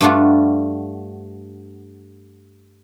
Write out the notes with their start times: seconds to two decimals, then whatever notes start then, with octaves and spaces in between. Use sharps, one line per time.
0.01 G2 G3 A3 D4 F4 F#4